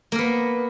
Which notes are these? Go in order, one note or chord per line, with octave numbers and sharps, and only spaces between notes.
A#3 B3 A#4